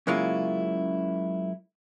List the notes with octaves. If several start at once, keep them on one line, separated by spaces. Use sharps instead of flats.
F#2 C#3 G#3 A#3 E4 F4